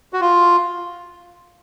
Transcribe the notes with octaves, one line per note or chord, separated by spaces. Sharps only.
F#4
F4